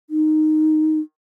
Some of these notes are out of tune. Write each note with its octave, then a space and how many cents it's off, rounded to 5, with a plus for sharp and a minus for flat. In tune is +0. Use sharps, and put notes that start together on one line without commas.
D#4 -5